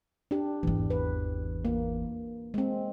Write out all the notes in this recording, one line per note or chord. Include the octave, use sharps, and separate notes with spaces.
D4 G4
G#1 E2 E3
B4
A#3
G#3 C4